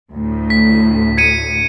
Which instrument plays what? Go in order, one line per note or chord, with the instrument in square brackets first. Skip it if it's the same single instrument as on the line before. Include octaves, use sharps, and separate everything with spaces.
[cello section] D2 A2
[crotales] B6
G#6 C#7 D#7